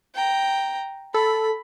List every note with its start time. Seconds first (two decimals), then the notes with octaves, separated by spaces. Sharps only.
0.15 G5 A#5
1.14 A4 B5